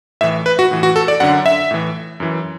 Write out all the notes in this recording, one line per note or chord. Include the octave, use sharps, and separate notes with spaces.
A2 E3 E5
B4
F#4
A2 E3
F#4
A4
D5
F#2 D3 F#5
E5
A2 E3
F#2 E3